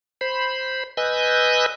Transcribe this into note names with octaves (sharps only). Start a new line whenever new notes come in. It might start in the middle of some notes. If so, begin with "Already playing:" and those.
C5 B5
B4 D#5 G#5 E6 F#6 G6